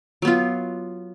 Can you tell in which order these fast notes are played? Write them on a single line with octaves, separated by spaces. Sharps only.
F#3 B3 F4